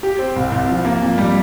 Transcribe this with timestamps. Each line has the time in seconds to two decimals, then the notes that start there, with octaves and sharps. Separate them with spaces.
0.03 G4
0.19 C4
0.36 C2
0.52 C2
0.69 F3
0.85 A#3
1.02 F2
1.18 G3